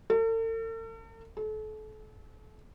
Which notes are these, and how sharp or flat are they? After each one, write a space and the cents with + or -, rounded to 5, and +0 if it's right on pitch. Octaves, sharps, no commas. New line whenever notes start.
A4 +45
A4 -35